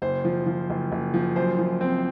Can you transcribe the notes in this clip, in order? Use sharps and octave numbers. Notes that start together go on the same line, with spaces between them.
F#1 C5
F3
F3
F#1
F#1
F3
F#2 C5
F3
C4